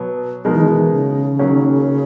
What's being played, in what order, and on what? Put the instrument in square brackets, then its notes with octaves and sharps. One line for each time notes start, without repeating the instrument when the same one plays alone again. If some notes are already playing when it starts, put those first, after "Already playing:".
Already playing: [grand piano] B2 F#3 B3
[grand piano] B2 G#3 D#4 A#4 [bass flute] F#3
[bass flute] E3
D#3
E3
C#3
[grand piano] D#3 F#3 A#3 C#4